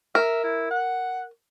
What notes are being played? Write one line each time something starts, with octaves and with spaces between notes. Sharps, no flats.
A#4 E5
E4
F#5